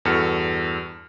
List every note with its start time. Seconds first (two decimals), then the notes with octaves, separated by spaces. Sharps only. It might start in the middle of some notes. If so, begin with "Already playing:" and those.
0.05 E2 G2 F#4 A4 F6 C#7